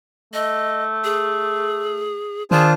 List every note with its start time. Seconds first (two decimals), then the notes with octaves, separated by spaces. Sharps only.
0.33 A3 D#5
1.04 G#4
2.51 D#3 D4 F4 G#4 C5 A5